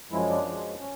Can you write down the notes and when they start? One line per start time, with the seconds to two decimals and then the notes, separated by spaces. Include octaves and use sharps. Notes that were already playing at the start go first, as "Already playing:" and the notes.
0.11 F#2 C#3 F3 G#3 E4
0.29 D4
0.47 F#2 C#3 F3 G#3
0.81 C#4